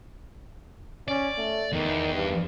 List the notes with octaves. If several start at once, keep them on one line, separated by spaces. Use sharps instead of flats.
C#4 D5
A3
E2 D#3
G2